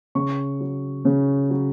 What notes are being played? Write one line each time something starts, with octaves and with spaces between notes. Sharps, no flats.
C#3 C#6
F#3
C#3
F#3